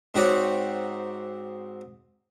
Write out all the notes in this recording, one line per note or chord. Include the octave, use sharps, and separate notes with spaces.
G#2 C4 D#4 F#4 C#5 D5